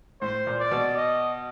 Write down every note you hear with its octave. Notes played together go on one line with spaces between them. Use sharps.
A2 C5
A#2
D5
B2
D#5